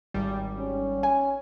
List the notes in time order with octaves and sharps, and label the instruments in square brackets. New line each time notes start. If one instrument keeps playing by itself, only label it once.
[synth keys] G#1 G3
[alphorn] C#4
[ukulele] G#5